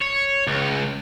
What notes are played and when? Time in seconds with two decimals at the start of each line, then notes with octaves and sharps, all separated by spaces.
0.02 C#5
0.47 C#2